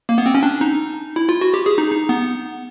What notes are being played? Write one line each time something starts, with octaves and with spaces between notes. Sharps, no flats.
A#3
B3
C4
C#4
D4
D#4
E4
F4
F#4
G4
G#4
D#4
D#4
B3